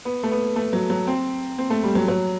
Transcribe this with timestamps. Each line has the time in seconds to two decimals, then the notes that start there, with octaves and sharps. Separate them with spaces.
0.05 B3
0.23 A3
0.31 B3
0.56 A3
0.73 F#3
0.90 F#3
1.07 C4
1.58 C4
1.70 A3
1.84 G3
1.95 F#3
2.08 F#3